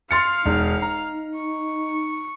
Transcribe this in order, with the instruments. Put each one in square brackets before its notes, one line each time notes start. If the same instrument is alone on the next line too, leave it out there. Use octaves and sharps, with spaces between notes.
[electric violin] F5 F6 [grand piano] C6 A6 C#7
[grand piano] E1 [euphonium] D#4
[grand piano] A#5
[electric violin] C#6